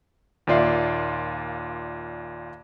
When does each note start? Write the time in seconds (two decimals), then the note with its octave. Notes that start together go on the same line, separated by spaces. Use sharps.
0.47 D#2 A#2 F4 D5 E5 C7